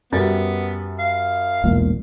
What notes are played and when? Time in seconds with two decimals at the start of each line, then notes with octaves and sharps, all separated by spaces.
0.12 F#2 G3 B3 A6
0.99 F5
1.64 E1 B1 A#2